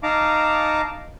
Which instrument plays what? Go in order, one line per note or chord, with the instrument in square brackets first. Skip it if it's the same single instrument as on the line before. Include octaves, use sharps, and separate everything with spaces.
[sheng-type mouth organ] D#4 F5 A5 A#5 D6